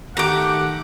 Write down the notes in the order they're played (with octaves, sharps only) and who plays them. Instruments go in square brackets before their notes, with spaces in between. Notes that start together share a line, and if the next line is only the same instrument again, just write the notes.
[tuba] D#3 [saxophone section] A3 G4 [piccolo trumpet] F#5 [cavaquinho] A#5 D6